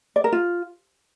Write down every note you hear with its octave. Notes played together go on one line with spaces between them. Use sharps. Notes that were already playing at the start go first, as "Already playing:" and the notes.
D5
A#4
F4